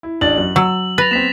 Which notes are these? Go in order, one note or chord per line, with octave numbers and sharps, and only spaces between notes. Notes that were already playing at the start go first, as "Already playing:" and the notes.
E4
A1 D4 A6 F#7
F#2
F#3 E6
B4 A6 A#6 F7
B3 C4 B6 E7